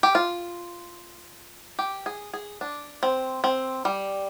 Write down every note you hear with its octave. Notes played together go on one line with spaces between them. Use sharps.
G4
F4
G4
G#4
G#4
D4
C4
C4
G3